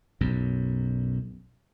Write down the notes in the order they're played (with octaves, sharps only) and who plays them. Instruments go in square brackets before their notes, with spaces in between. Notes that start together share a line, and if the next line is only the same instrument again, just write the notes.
[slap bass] B1 F#2